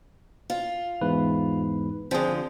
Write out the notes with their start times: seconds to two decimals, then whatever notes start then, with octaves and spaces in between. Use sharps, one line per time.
0.50 F4
1.01 E2 G#2 B4
2.11 D3 F3 C4 G#4